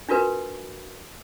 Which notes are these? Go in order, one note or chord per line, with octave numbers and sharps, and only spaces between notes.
D4 F4 F#4 A#4 B4